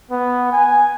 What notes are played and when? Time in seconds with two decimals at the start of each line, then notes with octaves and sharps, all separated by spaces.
0.11 B3
0.52 G#5